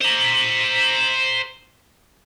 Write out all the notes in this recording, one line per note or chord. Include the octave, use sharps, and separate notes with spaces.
C5 A#5